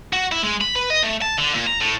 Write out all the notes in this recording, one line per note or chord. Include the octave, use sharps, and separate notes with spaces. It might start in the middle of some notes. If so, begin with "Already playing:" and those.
F#4
E4
G#3
B5
B4
D#5
A3
A5
D3
A#2
A#5
A2